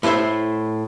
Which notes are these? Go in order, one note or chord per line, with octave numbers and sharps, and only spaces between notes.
A2 A3 E4 C5 E5